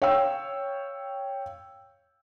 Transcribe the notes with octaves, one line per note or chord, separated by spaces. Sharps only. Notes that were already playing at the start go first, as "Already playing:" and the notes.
C#5 F5 G5 E6